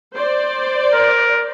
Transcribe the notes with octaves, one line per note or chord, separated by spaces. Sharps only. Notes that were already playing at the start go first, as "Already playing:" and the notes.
C5 D5
A#4